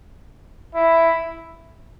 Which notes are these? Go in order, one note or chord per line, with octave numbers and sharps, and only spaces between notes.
E4